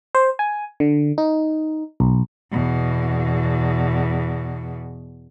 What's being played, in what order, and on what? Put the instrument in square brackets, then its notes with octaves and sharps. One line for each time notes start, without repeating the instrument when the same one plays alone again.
[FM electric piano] C5
G#5
D3
D#4
B1
[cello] E2 B2